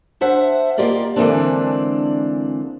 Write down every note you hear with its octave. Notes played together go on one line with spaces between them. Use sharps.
D4 C5 E5 F#5
A#3 F4 G4 A#4 D5 D#5
D3 E3 G#3 A#3 C4 D4